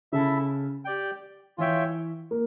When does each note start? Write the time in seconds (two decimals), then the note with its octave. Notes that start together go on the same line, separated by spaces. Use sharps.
0.12 C#3 E4 A4 E5
0.85 G4 D5 G5
1.58 E3 F4 C#5 E5 G5
2.31 A#3